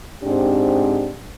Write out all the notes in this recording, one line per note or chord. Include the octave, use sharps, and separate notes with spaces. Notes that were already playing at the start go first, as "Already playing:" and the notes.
G#2 C4 D4 G4